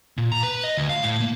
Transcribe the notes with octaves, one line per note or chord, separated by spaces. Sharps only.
A#2
A#5
B4
D#5
D2
F5
A2
A#3